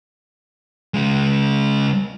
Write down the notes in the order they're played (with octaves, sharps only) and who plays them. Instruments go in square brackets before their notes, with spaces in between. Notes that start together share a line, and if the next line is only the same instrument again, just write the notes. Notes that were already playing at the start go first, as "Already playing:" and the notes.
[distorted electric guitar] C#3 G#3